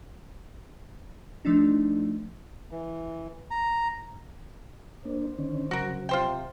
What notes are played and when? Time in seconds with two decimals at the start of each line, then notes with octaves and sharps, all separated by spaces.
1.45 F3 A3 D4 D#4
2.71 E3
3.51 A#5
5.05 A#3 D4 C5
5.38 D3 D#3 C#4
5.71 C#3 F#3 F#4 A#4
6.09 C3 F4 C5 G5